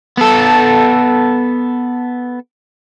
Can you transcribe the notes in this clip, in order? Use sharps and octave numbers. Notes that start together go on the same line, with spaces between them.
B3 A4